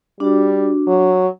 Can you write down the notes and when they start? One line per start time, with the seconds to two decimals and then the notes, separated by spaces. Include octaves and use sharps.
0.20 G3 D4 F#4
0.87 F#3